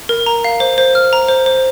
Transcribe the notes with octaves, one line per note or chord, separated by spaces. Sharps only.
A#4
A#5
F5
C5
C5
F6
A#5
C5
C5